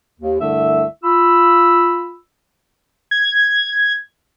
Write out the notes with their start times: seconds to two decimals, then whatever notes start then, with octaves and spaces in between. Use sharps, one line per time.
0.20 D#2
0.40 C2 G2 D3 A3 E5
1.04 F4 B5 E6
3.11 G#6